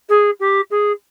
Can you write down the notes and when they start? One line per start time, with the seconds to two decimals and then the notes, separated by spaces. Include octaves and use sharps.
0.09 G#4
0.40 G4
0.71 G#4